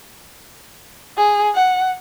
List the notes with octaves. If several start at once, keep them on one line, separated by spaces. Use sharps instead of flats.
G#4
F#5